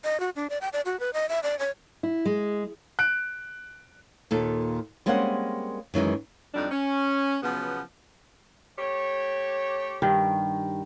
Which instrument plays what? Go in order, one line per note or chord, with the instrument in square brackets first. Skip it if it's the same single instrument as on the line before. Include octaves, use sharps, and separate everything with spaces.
[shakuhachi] D#5
F#4
D4
D5
G5
D5
F#4
B4
D#5
E5
D5
C#5
[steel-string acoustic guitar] E4
G#3
[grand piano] F#6 D7
[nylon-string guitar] D#2 A#2 A4
G3 G#3 A#3 C4 C#4 F#5
F#2 D#3 E3 G#3
[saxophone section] F2 D3 F#3 G3 D4 D#4
C#4
C#3 F3 F#3 B3
A3 G4 C#5
[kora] G2 D#3